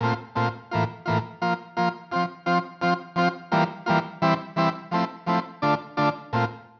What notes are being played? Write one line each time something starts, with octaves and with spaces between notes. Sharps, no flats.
A#2 A3 C4 F4
A#2 A3 C4 F4
A2 E3 A#3 F4
A2 E3 A#3 F4
F3 A#3 F4
F3 A#3 F4
F3 C4 F4
F3 C4 F4
F3 C4 F4
F3 C4 F4
E3 G3 A#3 F4
E3 G3 A#3 F4
E3 G3 C4 E4
E3 G3 C4 E4
F3 A3 C4 E4
F3 A3 C4 E4
D3 A3 D4 F4
D3 A3 D4 F4
A#2 A3 C4 F4